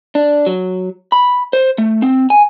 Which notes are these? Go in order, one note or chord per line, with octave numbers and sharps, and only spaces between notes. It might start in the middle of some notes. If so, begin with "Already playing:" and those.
D4
F#3
B5
C5
A3
C4
G#5